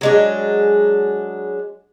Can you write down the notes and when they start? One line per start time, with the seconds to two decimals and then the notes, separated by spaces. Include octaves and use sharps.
0.01 F#3 G#3 D4